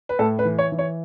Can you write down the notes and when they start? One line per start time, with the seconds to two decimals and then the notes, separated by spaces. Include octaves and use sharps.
0.09 B4
0.19 A2 A4
0.39 B4
0.45 E3
0.59 C#5
0.72 E3
0.79 C#5